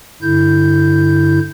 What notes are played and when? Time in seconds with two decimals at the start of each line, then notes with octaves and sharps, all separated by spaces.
0.22 G2 D3 E4 G6